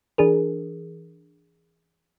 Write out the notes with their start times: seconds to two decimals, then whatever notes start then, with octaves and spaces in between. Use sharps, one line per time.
0.18 E3 D4 G#4 A#4